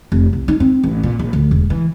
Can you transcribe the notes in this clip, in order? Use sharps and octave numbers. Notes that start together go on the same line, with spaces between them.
F1
C2
D#4
C4
A1
A#2
A#1
D2
E1
E3